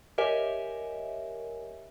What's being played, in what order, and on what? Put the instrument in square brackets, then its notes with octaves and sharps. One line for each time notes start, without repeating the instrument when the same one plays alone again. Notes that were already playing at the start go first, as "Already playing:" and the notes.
[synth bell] G4 A#4 C#5 D#5 E5 G#5